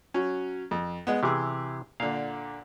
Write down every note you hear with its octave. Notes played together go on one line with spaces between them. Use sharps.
F#3 C#4
F2
G#3 B3
C3 E3 G4 G#4
A#2 D3 F5